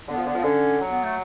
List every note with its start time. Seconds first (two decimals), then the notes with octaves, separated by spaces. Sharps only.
0.08 D3 B3
0.18 F3
0.26 D3
0.35 F3
0.44 D3 C#4
0.80 F#3
0.91 B3
1.03 A3